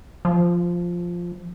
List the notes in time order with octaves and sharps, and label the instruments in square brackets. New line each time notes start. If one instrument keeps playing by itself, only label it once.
[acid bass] F3